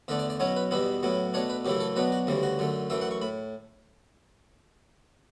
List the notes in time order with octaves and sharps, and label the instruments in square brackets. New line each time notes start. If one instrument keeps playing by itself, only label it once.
[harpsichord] E2 D3 A3 D4 E5
D5
D5
B2 F#3 C#4 E4 C#5
B4
E2 B2 G3 B3 E4 B4
A2 F#3 B3 E4
B2 A3 D4 C#5
B4
F#2 C#3 E3 A3 E4 G4
A4
B2 F#3 B3 D4 B4
F#4
D2 C#3 E3 G3
F#4
F#2 D3 A3
F#2 E3 A3 E5
F#5
C#6
A2 B5